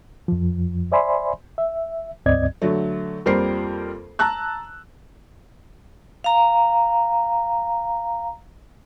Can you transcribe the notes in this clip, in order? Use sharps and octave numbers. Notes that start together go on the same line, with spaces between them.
F2 F3
C5 D5 E5 G#5 B5 C6
E5
C#2 G2 C4 D5 D#5 G#6
D3 F#3 A3
F2 G3 A#3 A#4 C5 C7
A5 A#5 E6 F#6
F5 A#5